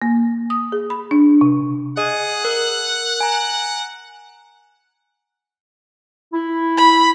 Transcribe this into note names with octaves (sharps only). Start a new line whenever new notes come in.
A#3
D#6
G#4
B5
D4
C3
G#4 D#5 F#5 D#6
A#4 F#6
G#5 A#5
E4
B5